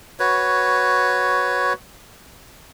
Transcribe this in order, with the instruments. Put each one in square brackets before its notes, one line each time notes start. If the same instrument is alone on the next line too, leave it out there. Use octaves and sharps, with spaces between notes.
[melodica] F#4 B4 C#5